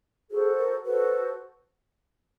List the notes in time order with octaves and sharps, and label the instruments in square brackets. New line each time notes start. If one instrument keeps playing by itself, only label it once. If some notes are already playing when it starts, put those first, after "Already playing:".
[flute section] F#4 A4 C5 [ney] G#4
[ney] A#4
[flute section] F#4 A4 C5 [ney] B4